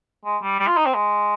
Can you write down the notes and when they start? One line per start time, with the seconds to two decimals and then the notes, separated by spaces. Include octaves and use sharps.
0.25 G#3
0.42 G3
0.60 G3
0.68 F4
0.77 D#4
0.86 C4
0.94 G#3